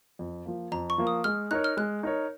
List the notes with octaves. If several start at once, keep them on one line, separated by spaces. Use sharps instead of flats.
F2
F3 A#3
F2 A#5
C#6
F3 A#3
D#6
G#3 F6
D#4 A#4 C#5 F#6
F6
G#3 F#6
D#4 A#4 C#5